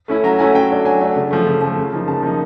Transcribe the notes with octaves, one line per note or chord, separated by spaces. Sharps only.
A3 C#4 E4
F#3 A#5
A3 C#4 E4 G#5
F#3 G5
A3 D4
F#3 G#5
A3 D4
C#3
F3 A3
C#3
F3 A3
C#3
F3 A#3 D#4
C#3 A5
F3 A#3 D#4